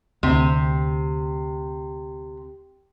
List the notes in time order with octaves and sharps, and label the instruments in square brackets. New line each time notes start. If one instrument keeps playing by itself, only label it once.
[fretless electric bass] D2 [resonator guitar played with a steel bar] C3